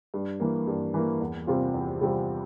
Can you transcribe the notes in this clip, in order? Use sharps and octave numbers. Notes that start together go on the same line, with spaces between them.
G2
E3 A#3
G2
E3 A#3
E2
C3 G3 C4 F4
E2
C3 G3 C4 F4